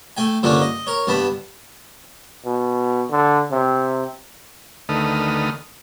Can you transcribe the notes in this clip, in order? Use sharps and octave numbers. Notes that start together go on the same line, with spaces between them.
A3 G5 G#5
G2 D3 F3 A#3 C#4 D4
D#5
A#4 C#5
G2 B3 A5 B5
B2
D3
C3
D2 D#3 A3 B4 D#6 F6